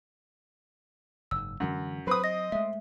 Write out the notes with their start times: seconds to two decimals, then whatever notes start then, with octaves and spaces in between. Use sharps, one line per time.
1.31 F#1 G#2 E6
1.60 F#2 D3 E3 G#3
2.07 F#3 C4 B4 D#6
2.24 D#5 A#6
2.52 G#3 A3 E5